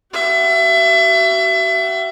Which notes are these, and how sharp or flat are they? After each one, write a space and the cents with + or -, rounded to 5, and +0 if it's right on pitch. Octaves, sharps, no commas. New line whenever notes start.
F#4 +40 E5 +30